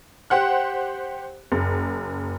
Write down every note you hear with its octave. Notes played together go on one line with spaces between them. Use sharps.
G4 C5 F#5 F#6
F#1